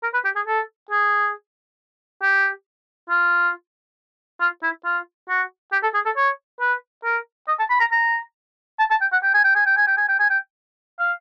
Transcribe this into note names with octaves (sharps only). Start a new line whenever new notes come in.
A#4
B4
G4
G#4
A4
G#4
G4
F4
F4
E4
F4
F#4
G4
A4
G#4
A4
C#5
B4
A#4
D#5
A5
B5
A#5
A#5
A5
A5
G5
F#5
G5
G#5
G5
G#5
G5
G#5
G5
G#5
G5
G#5
G5
F5